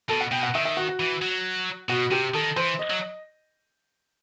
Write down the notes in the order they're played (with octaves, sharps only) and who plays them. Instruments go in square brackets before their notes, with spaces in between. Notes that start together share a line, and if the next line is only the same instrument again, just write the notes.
[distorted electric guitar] B2 [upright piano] A4
[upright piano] F#5
[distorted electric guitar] B2 [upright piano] G5
[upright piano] F#5
[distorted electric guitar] D#3 [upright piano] E5
[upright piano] E5
F#4
F#4
[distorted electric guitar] E3
F#3
[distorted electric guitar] B2 [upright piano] F#4
[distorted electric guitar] C3 [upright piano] G4
[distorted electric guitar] D#3 [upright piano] A4
[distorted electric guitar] E3 [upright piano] C5
[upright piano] D#5
[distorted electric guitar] F#3